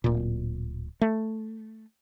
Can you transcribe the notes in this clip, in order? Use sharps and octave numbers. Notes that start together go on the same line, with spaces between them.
D1 A#2
A3